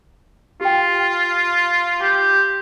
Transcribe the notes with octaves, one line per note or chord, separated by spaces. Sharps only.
F4 G4 G5
G4 C6